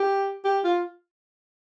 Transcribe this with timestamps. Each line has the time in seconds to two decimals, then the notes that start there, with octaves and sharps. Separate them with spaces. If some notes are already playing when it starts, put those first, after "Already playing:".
Already playing: G4
0.45 G4
0.65 F4